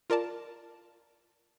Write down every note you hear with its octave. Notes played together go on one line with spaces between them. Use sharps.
F4 A#4 D5 A5